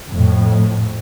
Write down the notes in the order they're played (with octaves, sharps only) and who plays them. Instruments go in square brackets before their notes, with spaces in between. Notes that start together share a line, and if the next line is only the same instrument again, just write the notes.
[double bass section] F2 A2